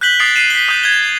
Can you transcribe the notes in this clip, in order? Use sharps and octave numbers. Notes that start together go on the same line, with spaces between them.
F#6 G6 B6 F#7 G7
D#6 A6 C7 D7
C7 D#7 E7
B6 G7
D#6 G6
G#6 A6 G7